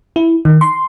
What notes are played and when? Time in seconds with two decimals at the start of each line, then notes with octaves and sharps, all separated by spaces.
0.16 E4
0.45 D#3
0.61 C6